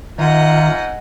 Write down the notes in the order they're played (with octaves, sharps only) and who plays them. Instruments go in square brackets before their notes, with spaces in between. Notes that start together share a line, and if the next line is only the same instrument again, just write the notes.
[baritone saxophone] G#2 [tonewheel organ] D#3 E5 A#5 [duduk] F4 [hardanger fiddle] D#5 F#5